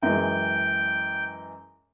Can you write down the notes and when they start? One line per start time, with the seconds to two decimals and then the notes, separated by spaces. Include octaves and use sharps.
0.03 F#2 E3 G#3 G5